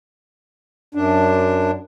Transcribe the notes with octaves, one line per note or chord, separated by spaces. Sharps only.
F#2 D4